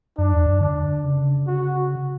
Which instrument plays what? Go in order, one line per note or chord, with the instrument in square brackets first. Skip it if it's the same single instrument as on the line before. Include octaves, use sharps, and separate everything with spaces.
[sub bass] F#2 [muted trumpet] D4
[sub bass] E2
F#2
[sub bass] D3 [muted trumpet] D4
[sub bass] C#3
[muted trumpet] F#4